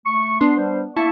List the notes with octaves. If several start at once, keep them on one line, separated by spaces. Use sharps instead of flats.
A3 C#6
B3 D4 C6
G3 C5
A#3 E4 E5 A5 C#6